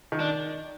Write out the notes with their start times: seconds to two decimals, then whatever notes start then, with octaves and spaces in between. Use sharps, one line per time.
0.12 D#3
0.20 D4